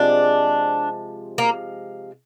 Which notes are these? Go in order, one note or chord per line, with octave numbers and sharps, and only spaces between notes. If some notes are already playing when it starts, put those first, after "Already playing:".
Already playing: C3 F3 G#3 D4
A#3